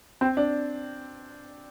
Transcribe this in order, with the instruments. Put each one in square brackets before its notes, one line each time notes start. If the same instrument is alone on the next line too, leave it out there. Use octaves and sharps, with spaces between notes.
[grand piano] C4
D4